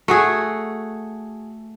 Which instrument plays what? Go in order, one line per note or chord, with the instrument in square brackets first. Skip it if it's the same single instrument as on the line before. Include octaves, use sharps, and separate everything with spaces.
[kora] A3 F#4 G#4